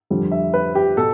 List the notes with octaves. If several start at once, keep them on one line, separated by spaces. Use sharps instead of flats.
F2 D3 G3
E5
B4
G4
B2 A4